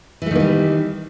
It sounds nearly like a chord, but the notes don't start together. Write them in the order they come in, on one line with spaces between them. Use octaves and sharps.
E3 A3 D#3 A#3 G3